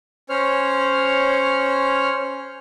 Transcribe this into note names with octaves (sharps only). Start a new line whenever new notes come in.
C#4 C5 C#5 F6